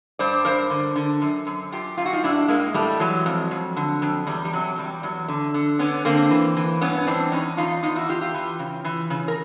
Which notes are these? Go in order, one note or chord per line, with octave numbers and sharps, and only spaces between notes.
G2 C5 D5
G2 A#4 C5
D3
D3
F#2
F#2
F#2 F4 G4
F#2 F4
F#4
D#4 F4
A2 D4 E4
A2 G#3 A#3
A2 G3 A3
E3 F#3 G#3
F2
F2
D3
F2
E2 G3
G3
C3 F#3
E2 G3
E2 F#3
D3
D3
D3 B3 C#4
D3 A#3 C4
E3
E3
G2 B3 C#4
C#4
E3 C4 D4
E2 C#4 D#4
E2 D#4 F4
E2 D#4 F4
E4 F#4
E2 F4 G4
F4 G4
E3
C#3
E3
C#3
A#4